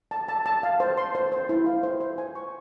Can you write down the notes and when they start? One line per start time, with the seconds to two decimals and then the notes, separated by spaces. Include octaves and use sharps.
0.11 A5
0.28 A5
0.46 A5
0.63 F5
0.80 C5
0.97 C6
1.15 C5
1.32 C5
1.49 E4
1.66 F5
1.83 C5
2.00 C5
2.18 G#5
2.35 C#6